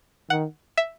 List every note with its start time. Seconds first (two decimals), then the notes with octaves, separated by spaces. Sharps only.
0.30 D#3 F#5
0.78 E5